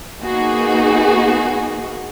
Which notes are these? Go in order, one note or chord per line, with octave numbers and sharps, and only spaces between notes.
A#3 B3 D#4 F#4 G#4